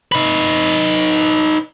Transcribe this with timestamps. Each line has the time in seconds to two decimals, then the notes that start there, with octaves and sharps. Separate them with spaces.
0.12 D#4 B4